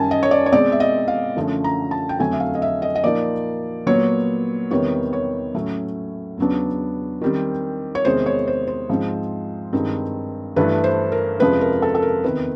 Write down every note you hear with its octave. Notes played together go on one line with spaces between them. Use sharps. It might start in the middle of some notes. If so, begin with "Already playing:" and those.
Already playing: F#2 D#3 G3 G#5 A5
D#5
C#5
D5
C#5
B2 G#3 C4 D5
E5
D#5
F5
F#2 D3 F3 A3 C#4
A#5
A5
G5
F2 D3 F#3 A3 C4 G#5
E5
F5
D#5
E5
D#5
D#5
A#2 F3 A#3 D#4 D5
A#2 F#3 B3 C#5
E2 C3 D#3 G3 B3 C#5
C#5
A2 F#3 A3 C#4
E2 C#3 F#3 B3 D4
D#3 G3 C4
C#5
E2 C3 D#3 G#3 C5
C#5
C5
C5
G#2 F3 G#3 C4
G2 D#3 G#3 C4 D#4
G2 E3 A3 D4 B4
C5
A#4
F2 C3 F3 G#3 C#4 B4
A#4
A4
A4
A#4
E2 C3 D#3 B4